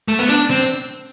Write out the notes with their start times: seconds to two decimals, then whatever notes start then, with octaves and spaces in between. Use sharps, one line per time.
0.08 A3
0.19 B3
0.29 D4
0.50 C4